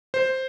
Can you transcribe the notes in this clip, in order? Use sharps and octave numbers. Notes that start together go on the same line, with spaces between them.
C5